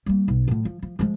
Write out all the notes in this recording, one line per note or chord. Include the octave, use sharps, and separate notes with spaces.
G3 A#3
B1
A2 F3
F3
F3
F3 G#3